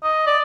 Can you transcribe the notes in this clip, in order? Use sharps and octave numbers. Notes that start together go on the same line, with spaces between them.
D#5
D5